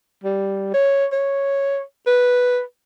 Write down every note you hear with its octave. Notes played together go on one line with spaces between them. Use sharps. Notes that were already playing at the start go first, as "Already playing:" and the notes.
G3
C#5
C#5
B4